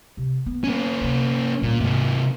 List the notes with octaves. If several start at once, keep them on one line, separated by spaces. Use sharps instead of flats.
C3
B3
A#3 C#4
C3 F3
A#2 D3 G3
C2 G#2 C3 A#3